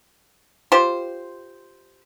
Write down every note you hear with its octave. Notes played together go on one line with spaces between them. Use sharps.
F4 G4 C5